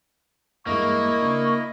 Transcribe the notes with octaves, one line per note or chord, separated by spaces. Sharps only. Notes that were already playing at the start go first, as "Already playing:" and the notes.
E2 G2 G#3 A#3 E4 D#5 C#6
C#3 D4